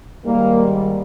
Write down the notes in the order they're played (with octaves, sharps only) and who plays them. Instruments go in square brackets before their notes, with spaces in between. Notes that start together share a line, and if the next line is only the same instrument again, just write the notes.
[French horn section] G#2 D#3 G3 A#3